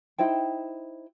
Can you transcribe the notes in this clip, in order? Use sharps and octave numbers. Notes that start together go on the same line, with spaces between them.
D#4 E4 C5 G5